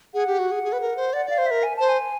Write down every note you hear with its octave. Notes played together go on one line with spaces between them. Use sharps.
G#4 F#5
G4
F#4
G#4
G#4
B4
A#4
C5
D5 F#5
D5 F5
C5
A#4 E5
G#5
C5 A5
G#5